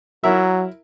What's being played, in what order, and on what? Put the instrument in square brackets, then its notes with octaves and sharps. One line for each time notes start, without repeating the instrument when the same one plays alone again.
[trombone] F#3 [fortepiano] E4 A#4 E5